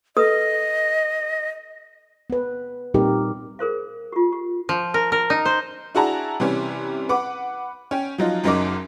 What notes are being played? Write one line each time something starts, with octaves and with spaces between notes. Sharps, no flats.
A4 B4 D#5 D#6
B3 B4
A#2 G3 C4 D#4 G4 A#4
G#4 A#4 C5 F5
F4 G4
G4
F3
A#4
A#4
D#4
C5
D4 E4 F#4 G#4 A5 A#5
C3 E3 G3 C#4
B4 F#5 D6
C#4 G5
F3 F#3 D#4 F4
F#1 F#2 F#3 D#4 A#4 D6